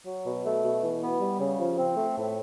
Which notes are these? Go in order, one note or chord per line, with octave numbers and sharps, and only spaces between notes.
F#3
B2
A3
B2
E3
B3
G3
C#3
F3
C4
A3
A2